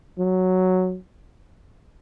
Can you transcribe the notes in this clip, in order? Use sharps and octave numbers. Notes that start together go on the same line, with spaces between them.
F#3